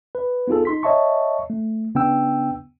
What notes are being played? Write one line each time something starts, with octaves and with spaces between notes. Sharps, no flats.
B4
B3 D#4 F4 G#4 A4
D#4 C6 B6
C#5 D#5 E5 A5 C#6
A3
C#3 B3 D4 G5 E6